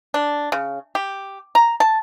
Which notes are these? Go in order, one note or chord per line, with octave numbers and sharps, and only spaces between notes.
D4
C#3
G4
A#5
A5